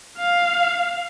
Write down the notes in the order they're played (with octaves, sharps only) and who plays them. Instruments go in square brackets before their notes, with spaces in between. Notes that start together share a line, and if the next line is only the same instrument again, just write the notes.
[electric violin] F5